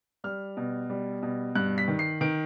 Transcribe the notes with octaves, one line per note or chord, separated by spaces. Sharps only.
G3 F6
B2
G3
B2
G2 F#6
B6
D#3
C7
D#3 D7